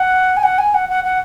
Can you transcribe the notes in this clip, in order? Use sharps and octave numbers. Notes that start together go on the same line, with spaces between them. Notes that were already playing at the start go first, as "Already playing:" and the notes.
Already playing: F#5
G#5
F#5
G#5
F#5
F#5
F#5